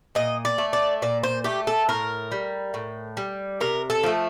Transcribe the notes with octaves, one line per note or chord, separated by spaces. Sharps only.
A#2 D#5
D5
A3
D5
A#2 D5
C5
A3 G4
A4
A2 A#4
G3
A2
G3
C3 A#4
A4
F3 A3